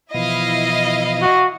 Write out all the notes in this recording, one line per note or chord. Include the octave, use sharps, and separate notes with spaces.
B2 E3 F3 E4 D#5 F5
F#4